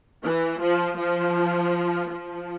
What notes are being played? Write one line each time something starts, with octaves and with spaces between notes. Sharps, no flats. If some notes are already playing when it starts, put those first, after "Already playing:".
E3
F3
F3
F3